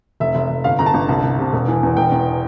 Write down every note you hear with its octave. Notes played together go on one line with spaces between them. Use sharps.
F1 E5
F1
F1
G1 F5
G1 A#5
A5
G1
C2
C2
C3
E1
E3
E2
E1 G5
E2